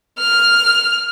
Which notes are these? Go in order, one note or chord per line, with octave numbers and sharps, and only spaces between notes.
F6